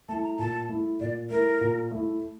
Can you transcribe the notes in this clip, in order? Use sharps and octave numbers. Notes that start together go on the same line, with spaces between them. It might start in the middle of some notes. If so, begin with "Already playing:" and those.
A3 E4 A5
A#5
A#2 A5
A3 E4
A#2 D5
A3 E4 A#4
A#2
A3 E4